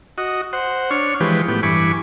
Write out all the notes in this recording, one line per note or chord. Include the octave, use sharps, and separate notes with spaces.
F#4 D#5
C5 F#5
D4 C#5 C#6 F6
E3 F3 G#3 G4 B4
A2 B3 G4
G2 E3 G#5 B5 C#6 D6